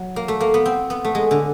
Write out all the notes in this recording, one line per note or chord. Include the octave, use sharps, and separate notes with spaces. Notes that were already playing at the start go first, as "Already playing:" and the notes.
Already playing: F#3
A#3
A3
A#3
B3
C4
B3
A3
G#3
D3